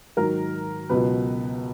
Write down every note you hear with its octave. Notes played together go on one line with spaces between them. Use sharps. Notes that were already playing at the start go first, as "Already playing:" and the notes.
G#2 D#3 F#3 A#4
C#2 B2 F#3 B4